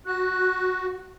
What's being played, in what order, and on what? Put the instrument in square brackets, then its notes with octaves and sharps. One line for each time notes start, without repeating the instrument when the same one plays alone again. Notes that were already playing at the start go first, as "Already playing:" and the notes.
[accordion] F#4 [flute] F#6